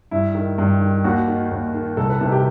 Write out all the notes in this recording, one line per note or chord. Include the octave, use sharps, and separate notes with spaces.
G2 E4
D#3
G2
D#3
D#2 F#4
D#3
D#2
D#3
C2 A4
B4
C3 D#3 A4
G4